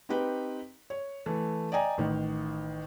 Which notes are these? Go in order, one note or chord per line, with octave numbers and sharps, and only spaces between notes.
C4 D#4 G4 B4 G5
C#5
E3 A3
D5 D#5 G5 G#5 A#5
A1 D#3